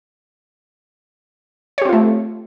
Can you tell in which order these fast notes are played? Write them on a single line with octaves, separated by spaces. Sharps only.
C#5 G4 C4 F4 A3